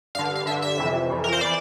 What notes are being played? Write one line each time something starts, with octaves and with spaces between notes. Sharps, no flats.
G2 D3 F5
F5
F5
G2 D3 E5
E5
F2 C3 E3
F2 E3
A#4
C5
E3 D5